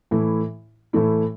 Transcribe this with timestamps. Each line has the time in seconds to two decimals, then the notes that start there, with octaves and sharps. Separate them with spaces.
0.11 A2 E3 A3 E4
0.93 A2 E3 A3 E4